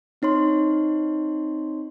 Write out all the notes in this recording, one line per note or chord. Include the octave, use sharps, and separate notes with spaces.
C4 D#4 C#5 C6